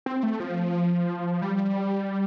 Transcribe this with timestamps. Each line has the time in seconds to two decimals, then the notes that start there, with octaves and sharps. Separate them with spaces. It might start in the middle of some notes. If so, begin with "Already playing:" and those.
0.06 C4
0.23 A3
0.40 F3
1.42 G3